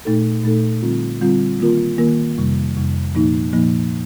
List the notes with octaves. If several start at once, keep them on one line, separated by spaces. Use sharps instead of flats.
A#2 A3 D#4 A4
A#2 A3 D#4 A4
D3 G3 C4 F4
D3 G3 C4 F4
D#3 A#3 F4 A#4
D#3 A#3 F4 A#4
F2 C3 G3
F2 C3 G3
A#2 F3 A#3 D#4
A#2 F3 A#3 D#4